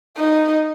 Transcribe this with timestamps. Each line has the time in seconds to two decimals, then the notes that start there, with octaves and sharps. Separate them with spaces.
0.17 D#4